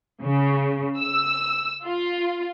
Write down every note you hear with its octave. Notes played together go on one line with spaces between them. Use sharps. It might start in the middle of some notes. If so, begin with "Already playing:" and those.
C#3
E6
F4